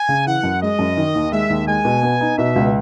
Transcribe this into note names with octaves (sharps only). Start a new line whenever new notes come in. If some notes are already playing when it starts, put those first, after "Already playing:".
Already playing: G#5
C#3
E3 F#5
F#2
G#3 D#5
F#2
D#3
D#2
G#3 E5
D#2
G#3 G#5
B2
B3
D#4
B2 E5
C#2